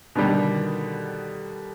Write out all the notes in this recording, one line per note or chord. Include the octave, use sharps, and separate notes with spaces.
B2 D3 D#3 G3